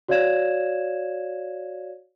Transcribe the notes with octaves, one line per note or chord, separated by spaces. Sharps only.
F#4 C#5 D5 F5 G#6 E7